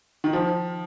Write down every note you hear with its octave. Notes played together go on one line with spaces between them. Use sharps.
D#3
F3